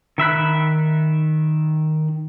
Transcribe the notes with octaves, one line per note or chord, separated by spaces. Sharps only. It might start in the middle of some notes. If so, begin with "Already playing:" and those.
D#3 E5 B5 F#6